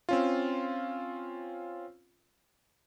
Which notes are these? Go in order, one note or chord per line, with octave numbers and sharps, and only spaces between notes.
C4 C#4 F4